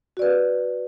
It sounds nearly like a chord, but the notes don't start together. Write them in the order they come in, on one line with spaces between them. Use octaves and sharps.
F#4 D5 B4